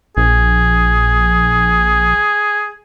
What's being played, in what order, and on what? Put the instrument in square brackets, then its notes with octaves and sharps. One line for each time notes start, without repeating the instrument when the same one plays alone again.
[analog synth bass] A#1 [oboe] G#4